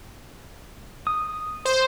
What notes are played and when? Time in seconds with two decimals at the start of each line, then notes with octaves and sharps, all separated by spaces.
1.07 D#6
1.65 C5